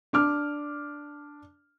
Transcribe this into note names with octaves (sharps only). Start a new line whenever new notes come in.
D4 D6 F6